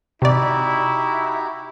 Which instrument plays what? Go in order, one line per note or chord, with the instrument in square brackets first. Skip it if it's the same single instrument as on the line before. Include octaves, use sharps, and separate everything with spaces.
[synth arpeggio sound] C3 D5 [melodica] D#4 F#4 G4 [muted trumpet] E4